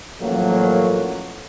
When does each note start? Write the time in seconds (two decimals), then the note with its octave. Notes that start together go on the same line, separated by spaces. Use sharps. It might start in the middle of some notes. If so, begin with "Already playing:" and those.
0.21 A1 F3 F#3 A3 A#3